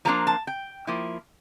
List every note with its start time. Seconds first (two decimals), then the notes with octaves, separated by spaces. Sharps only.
0.05 F3 A#3 D4 F4 A#5
0.27 A5
0.47 G5
0.87 F3 A#3 E4